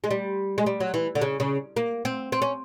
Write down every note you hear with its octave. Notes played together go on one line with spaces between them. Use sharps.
G#3
G3
G#3
G3
F#3
E3
D3
C#3
C#3
A#3
C4
C4
C#4